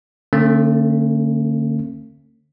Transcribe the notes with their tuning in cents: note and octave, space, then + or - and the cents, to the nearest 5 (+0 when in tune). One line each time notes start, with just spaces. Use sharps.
D3 +0 A3 +45 C#4 -45